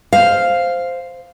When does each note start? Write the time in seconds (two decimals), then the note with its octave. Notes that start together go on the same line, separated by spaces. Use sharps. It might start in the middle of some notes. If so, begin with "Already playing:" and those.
0.13 C5 F5